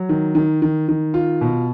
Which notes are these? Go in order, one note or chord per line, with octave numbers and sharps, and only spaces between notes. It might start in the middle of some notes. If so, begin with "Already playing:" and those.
Already playing: F#3
D#3
D#3
D#3
D#3
F4
B2